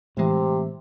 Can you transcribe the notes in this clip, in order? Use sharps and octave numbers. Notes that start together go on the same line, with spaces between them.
A2 C3 E3 G#3